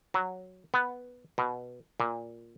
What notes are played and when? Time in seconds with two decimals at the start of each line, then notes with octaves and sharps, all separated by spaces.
0.14 F#3
0.74 B3
1.38 B2
2.00 A#2